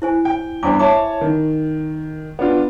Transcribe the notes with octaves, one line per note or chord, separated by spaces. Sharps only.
E4 C5 G#5
G5
E2 G2 C5 G#5 D6
E4 C#5 A5 D6
D#3
B3 D4 F4